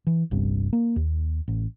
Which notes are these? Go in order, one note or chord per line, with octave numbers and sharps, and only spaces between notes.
E3
G1 C2 G2
A#3
D#2
A1